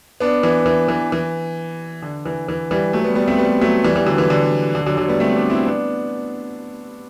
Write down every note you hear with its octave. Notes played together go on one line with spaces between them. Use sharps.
B3 D4
E3
E3
E3
E3
D3
E3
E3
E3 G3
F#3 A3
G3 B3
G3 B3
A3 C4
G3 B3
F#3 A3
E3 G3
E3 G3
D3 F#3
E3
D3
D3
D3 F#3
D3 F#3
G3 B3
A3 C4
B3 D4
C4 E4
B3 D4